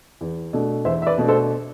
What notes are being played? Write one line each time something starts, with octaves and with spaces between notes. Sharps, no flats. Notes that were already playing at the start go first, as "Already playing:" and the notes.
E2
B2 A3 D4
E2 C5 E5
E5
B4 D5
B2 A3 D4
A4 C5